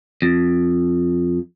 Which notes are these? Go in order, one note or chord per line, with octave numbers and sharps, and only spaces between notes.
F2